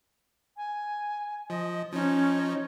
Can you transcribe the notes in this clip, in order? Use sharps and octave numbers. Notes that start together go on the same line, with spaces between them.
G#5
F3 D#5
F3 C#4 D#4 C#5